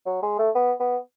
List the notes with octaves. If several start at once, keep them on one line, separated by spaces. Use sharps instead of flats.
F#3
G#3
A3
B3
B3